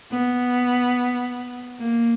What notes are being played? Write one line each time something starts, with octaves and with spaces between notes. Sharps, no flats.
B3
A#3